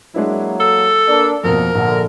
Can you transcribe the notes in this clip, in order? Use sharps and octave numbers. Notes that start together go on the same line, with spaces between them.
F#3 G#3 A#3 D4 E4
A4 E6
A#3 D4
F2 B2 A#3 A#4
A#1 D3